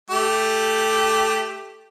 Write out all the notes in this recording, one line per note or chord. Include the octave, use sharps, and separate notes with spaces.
A3 G4